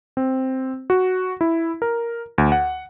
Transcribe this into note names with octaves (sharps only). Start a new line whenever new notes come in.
C4
F#4
E4
A#4
D2
F#5